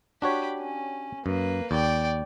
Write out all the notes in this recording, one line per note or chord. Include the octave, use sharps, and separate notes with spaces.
D4 F#4 G4 C#5 B5
C#4
F#2 A#3 B4
D#2 D5 G5